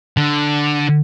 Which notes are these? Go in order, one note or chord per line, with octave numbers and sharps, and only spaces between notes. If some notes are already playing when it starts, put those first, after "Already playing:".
D3